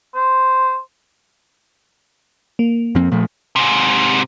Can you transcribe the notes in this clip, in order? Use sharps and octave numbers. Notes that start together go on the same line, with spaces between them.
C5
A#3
F2 F3 C4
A#2 F3 A3
G#2 C3